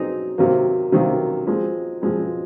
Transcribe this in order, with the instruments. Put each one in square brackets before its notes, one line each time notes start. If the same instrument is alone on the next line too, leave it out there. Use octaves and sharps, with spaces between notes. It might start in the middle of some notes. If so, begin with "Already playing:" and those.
Already playing: [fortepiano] F#3 C4 D#4 G#4
C3 D#3 F#3 A#3
C3 D#3 F#3 A#3
F3 G#3 C4
F3 G#3 C4